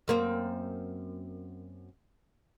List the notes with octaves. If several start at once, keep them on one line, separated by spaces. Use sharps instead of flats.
F#2 A#3 C4